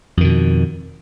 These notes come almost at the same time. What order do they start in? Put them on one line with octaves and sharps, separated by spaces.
F2 D#3 B2